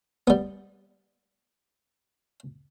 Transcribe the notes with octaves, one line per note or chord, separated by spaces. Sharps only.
G3 B3